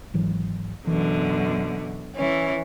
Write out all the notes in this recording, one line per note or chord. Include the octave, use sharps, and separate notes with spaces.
G#1 E3 F#3
F#2 B2 D3 E3
E3 C#4